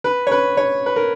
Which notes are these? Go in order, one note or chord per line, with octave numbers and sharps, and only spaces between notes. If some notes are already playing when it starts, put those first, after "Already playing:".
B4
C#5
B4
C#5
B4
A#4